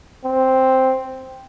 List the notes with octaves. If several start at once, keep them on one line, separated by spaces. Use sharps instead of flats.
C4